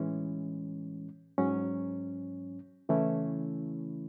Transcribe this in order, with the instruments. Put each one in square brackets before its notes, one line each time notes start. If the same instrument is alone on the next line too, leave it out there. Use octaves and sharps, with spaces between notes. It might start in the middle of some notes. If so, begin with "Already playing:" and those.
Already playing: [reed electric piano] A2 E3 G#3 C#4
G#2 F#3 C#4
C#3 E3 A3 C#4 E4